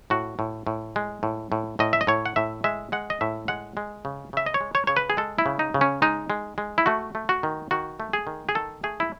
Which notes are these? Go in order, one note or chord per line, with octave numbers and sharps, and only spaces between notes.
A2 F#4
A2
A2
G#3
A2
A2
A2 D#5
E5
D#5
A2 C#5
F#5
A2 E5
G#3 E5
G#3 F#5
D#5
A2 E5
G#3 F#5
G#3
C#3
C#3 E5
D#5
C#5
G#3
C#5
C#3 C#5
B4
G#4
G#3 A4
E4
C#3
D#4
C#3
C#4
G#3 D#4
G#3
G#3
E4
A3 F#4
A3
F#4
D#3
D#3 F#4
A3
G#4
D#3
G#4
D#3 A4
A3 G#4
E4